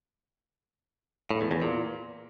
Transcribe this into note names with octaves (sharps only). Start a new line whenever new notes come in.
A2
E2
E2
A#2